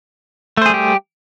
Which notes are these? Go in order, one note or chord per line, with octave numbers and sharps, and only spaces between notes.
G3 A3 G4 G#4 C5